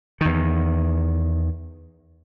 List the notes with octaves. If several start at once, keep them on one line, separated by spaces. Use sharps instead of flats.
E2 D#3